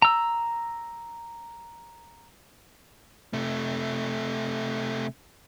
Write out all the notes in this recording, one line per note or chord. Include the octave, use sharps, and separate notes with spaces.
A#5 E6
C3 A3